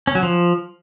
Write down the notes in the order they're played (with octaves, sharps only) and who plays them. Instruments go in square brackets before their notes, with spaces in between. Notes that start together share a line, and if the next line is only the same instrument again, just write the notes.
[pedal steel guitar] C#4
F#3
F3